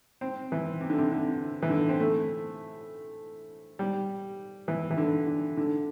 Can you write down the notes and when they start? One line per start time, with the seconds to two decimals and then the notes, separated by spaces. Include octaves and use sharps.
0.21 C4
0.52 E3
0.81 C3
0.90 D3
0.98 C3
1.11 D3
1.62 E3
1.70 D3
1.89 C4
2.00 A3
3.79 G3
4.68 E3
4.91 E3
4.97 D3
5.27 D3
5.57 D3